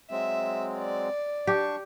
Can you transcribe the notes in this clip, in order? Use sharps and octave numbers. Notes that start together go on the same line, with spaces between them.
F#3 G#3 C4 E5
D5
D4 G4 C#6